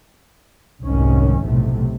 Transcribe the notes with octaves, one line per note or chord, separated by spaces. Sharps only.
F1 C2 G#2 D#3 C#4
B1 A2 C3 A3